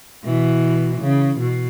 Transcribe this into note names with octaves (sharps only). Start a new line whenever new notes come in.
B2 E3
C#3
B2